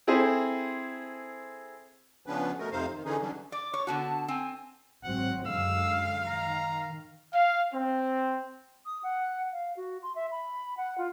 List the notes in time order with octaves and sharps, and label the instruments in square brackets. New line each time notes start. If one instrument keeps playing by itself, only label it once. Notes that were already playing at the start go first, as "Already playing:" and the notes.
[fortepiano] C4 E4 G#4 A4 C5
[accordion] C#3 F3 B3 C#4 D4 B4
B2 A3 A#4
F2 C3 D#4 C5 F5
D#3
D3 E3 C#4 D#4 G#4
D3 E3 F#3 G3 C#4 D4
[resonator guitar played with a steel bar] D5 [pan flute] D6
[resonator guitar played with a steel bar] C#5
[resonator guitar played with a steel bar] D3 B3 F#4 [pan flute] A5
[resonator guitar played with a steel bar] C4 [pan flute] G#5
[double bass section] G#1 F#3 C4 [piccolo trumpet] F#5
[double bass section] F#2 D3 G#3 [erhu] F5 [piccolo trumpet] E6
[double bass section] D#3 [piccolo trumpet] A#5
[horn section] F5
C4
[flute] D#6
F#5
F5
F#4
C6
E5
B5
F#5
F4